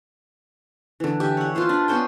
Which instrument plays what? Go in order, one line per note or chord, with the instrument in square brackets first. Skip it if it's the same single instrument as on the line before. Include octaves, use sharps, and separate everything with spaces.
[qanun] D3 E3
G4 E5 G#5
C#5 F#5
F4 A4 B4 C5
D4
B3 C#4 C5 G5